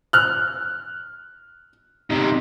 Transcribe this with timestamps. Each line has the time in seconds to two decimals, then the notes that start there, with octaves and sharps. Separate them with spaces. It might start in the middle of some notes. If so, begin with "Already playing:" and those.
0.13 F6 F#6
2.11 C3 D#4